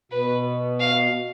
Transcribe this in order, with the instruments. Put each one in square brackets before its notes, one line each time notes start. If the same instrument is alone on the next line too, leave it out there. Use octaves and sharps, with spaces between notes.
[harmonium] B2 [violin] B4
[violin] F5